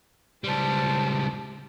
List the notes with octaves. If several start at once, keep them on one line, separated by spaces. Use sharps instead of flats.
C#2 G3 C5 A5